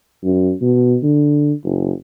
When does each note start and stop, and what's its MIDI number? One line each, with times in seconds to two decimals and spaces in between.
0.23 0.52 42
0.61 0.97 47
1.02 1.53 50
1.64 1.92 30